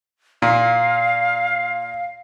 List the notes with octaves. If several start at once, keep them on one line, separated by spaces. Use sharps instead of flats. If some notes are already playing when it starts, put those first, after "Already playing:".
A#2 F5